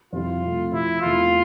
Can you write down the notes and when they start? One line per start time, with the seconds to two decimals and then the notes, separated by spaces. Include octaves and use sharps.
0.12 F2 C3 G3 C4 E4 F4
0.42 C3 F3 A3
0.72 C3 F3 C4 E4
1.02 E2 C3 E3 A3 F4